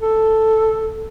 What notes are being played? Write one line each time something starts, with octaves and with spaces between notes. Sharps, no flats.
A4